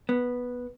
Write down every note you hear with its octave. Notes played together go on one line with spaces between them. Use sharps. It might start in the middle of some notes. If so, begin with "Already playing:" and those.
B3